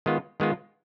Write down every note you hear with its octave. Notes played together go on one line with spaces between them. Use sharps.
D#3 G#3 B3 F4
D#3 G#3 B3 F4